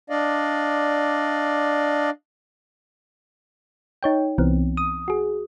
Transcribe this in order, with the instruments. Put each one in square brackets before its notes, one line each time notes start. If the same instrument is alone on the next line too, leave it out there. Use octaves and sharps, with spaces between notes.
[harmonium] D4 D5 D#5 F5
[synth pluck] D#4 C#5 G5
C2 E3 B3 C4
D#6
F#4 G#4